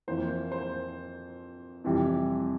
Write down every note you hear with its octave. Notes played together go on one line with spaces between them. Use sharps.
F2 E3 A#3 C5
C5
F2 C3 E3 G3